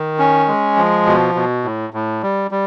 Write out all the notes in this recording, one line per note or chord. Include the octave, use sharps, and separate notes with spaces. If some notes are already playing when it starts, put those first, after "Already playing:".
Already playing: D#3
C#4
G#3
F3
B2
B2
A2
A2
G3
G3